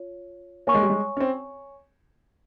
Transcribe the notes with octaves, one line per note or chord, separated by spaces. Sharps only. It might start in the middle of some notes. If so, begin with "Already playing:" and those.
Already playing: F4 C#5
A#3 C#5 G#5 C#6
G#3
G3
G#3
C#4
C4